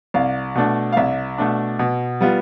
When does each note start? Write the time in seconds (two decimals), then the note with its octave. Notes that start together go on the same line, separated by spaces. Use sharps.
0.14 C2 F5
0.55 B2 A3 D4
0.93 F5
0.97 C2 E5
1.38 B2 A3 D4
1.79 B2
2.21 G3 B3 F4